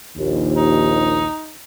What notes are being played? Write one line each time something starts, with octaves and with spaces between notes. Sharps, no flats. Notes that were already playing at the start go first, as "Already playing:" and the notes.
A#1 D#2
D#4